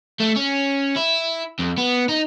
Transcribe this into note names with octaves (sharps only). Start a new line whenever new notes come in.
A3
C#4
E4
F2
B3
D#4